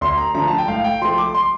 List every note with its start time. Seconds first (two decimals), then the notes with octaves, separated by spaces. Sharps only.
0.01 D2 C6
0.18 A#5
0.34 D3 F3 A3 A#5
0.48 A5
0.58 G5
0.68 A2 F5
0.84 G5
1.01 F3 A3 C6
1.18 D6
1.35 C6